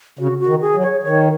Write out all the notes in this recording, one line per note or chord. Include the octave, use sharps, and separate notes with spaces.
C#3 F#4
F#4
D#3
G#4
F#3
C#5
D#3 C#5